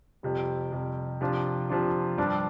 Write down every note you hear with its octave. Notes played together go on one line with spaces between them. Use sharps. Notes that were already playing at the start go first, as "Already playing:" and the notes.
F2 C3 G3
F2 C3 G3
C3 F3 D4 F4
C3 F3 D4 F4
G2 F3 D4